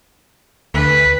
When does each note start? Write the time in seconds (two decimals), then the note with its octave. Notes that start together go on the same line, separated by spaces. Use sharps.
0.74 D2 B4